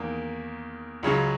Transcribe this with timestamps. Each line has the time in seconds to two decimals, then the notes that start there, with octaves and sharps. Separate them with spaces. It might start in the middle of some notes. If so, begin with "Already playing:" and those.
Already playing: E2 D#3 A#3 D#4
1.03 C#2 C#3 F#3 C#4